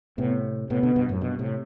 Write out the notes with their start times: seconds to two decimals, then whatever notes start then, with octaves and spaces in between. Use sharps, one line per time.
0.18 A2 C3 B3
0.70 A2 C3 B3
0.83 B2 D3
0.96 G2 B2
1.09 F#2 A2
1.21 G2 B2
1.39 A2 C3